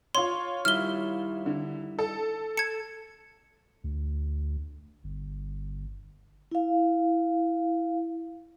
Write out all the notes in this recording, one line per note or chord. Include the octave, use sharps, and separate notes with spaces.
F4 C#5 C6
D#3 G3 E4 F6 G7
D3
A4
A5 G#6 C#7
D2
G1
E4 F5